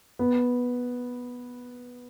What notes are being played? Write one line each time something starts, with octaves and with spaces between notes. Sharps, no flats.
B3